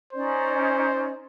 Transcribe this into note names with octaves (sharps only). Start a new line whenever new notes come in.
C#4 D#4 C5 D5